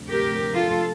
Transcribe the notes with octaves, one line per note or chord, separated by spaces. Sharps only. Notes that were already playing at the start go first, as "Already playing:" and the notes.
Already playing: D2 C3 F3
G4 A#4
F4 A4